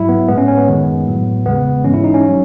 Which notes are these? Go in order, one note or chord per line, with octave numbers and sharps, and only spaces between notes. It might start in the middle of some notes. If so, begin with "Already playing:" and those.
Already playing: G#2 F#3 E4
B3
A2 G#3 B3
C#4
C#4
B3
F#2 D#3 G#3
A2 F#3
E2 C#3 G#3 B3
G#2 E3 G#3 C#4
E4
D#4
C#4
F#3